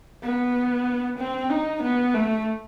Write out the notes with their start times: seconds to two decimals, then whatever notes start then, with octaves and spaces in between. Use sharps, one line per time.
0.23 B3
1.18 C4
1.50 D#4
1.83 B3
2.14 A3